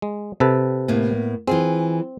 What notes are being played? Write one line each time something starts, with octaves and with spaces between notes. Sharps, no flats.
G#3
C3 A4 B4
A2 A#3 B3
E3 C4 F4 G#4